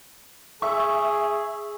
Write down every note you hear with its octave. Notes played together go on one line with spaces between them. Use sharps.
G#4 E5 C#6